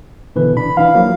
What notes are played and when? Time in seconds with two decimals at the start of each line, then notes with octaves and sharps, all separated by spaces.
0.36 B2 D3 E3 B4
0.57 D4 B5
0.77 E3 D4 E4 F5
0.94 F3 F#3 A#3